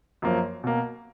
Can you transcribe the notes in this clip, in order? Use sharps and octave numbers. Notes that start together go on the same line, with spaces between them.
F#2 F3 A#3
B2 A#3